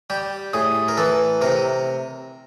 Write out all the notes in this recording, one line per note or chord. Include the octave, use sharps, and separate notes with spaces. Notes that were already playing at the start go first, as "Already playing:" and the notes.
G3 G4
A2 G#4
A#4
E3 A4
C3 A#4